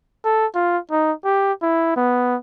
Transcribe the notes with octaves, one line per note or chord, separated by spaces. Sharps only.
A4
F4
D#4
G4
E4
B3